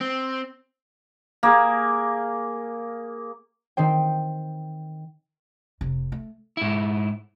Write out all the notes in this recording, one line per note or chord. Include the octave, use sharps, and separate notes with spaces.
C4
A#3 G#4
D#3 C4 C5 G5
F1 C3
A3
G#2 E4